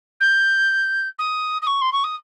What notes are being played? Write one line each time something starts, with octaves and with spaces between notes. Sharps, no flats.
G6
D#6
D#6
C#6
C6
C#6
D#6